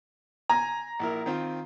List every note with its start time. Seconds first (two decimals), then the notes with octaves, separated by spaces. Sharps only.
0.50 G#5 A#5
0.99 A#1 E4 A#4
1.26 D#3 C4 F4